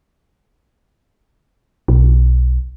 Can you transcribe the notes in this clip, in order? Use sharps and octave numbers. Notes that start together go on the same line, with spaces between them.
B1